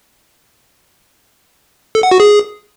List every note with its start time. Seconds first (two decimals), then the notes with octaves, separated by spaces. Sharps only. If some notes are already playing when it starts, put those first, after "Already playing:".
1.95 A4
2.03 F#5
2.11 F#4
2.20 G#4